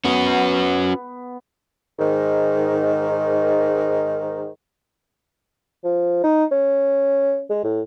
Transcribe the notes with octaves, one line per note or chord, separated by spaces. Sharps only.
B3 C#4 F#4
G#2 D#3
F3
D#4
C#4
G#3
A2